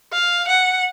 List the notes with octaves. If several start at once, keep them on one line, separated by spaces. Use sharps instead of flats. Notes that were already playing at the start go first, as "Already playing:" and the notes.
F5
F#5